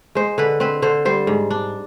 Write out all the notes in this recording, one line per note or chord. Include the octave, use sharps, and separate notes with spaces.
G#3 C5
D3 B4
C4 B4
D3 C5
G3 C5
G#2
D4